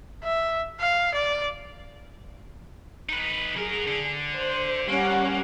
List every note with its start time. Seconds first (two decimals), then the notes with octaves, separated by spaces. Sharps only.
0.24 E5
0.80 F5
1.14 D5
3.09 D#4 B4
3.57 F#3 G#4 A#4
3.87 D3
4.35 C5
4.88 G3 A#3 C#4 F#5